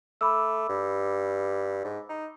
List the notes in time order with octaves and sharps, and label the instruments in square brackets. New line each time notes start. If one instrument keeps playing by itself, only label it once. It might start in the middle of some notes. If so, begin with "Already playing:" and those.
[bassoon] A3 [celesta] B5 D6 E6
[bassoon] G2
G#2
D#4